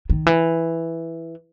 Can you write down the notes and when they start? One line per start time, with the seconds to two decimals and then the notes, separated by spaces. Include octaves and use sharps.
0.10 D#3
0.27 E3